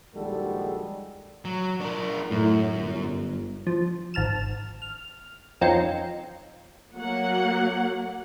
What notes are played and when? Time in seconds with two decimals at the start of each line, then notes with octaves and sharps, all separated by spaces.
0.14 A#1 D#2 G3 G#3 F#4 A4
1.45 F#3
1.81 D4 A#4
2.31 F#2 A2
2.75 G1
3.67 F3
4.14 G#1 A5 F6 E7
4.82 F6
5.61 F2 C4 C#4 D#4 F4 C#7
6.95 F#3 A#3 F#5